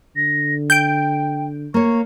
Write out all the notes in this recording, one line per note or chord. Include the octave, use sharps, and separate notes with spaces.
D3 A#6
G5 G6 D7
A#3 C#5 C#6